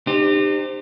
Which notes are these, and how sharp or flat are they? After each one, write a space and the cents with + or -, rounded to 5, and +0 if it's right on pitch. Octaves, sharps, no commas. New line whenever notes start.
D#4 -35 G4 +15 C5 +0